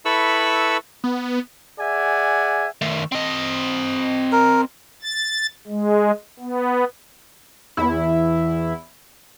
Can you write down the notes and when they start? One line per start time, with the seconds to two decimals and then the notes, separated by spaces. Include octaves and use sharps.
0.05 E4 A4 B4 B5 C#6 E6
1.04 B3
1.79 G#4 D5 E5 F#5 G#5
2.82 D#3 A3
3.12 C4 D#5
4.32 A#4
5.02 A6
5.68 G#3
6.39 B3
7.77 E2 E4